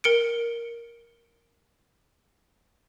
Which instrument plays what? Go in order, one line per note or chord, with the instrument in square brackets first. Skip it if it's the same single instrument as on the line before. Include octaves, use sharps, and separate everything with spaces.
[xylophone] A#4 C#7 D7